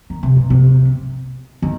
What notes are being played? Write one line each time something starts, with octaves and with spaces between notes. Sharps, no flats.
D#3
C3
B2
C3
D#3